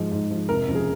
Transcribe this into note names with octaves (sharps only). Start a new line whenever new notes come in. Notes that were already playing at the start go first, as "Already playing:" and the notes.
Already playing: G#2 F3 G#3
G#2
F3 G#3
F1 A#4
D#2 C#3 F3
G#4